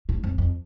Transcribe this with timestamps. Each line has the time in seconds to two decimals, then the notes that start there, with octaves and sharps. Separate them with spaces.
0.09 A2
0.23 F2
0.38 F2